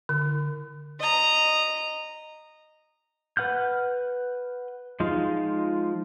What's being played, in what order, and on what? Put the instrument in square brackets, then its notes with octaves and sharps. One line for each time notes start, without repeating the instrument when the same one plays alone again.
[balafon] D3
[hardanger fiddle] D#5 A#5
[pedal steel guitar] B4 F#5 F6 G6
F3 G#3 D#4 F4